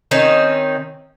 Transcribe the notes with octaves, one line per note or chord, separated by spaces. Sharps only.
D#3 C4 C#4 D#4